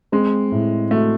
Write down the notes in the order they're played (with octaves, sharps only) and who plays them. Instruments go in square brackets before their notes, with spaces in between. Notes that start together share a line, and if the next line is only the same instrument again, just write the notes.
[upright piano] G#3 [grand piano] C4
[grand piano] A2
[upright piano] A3 [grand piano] F#4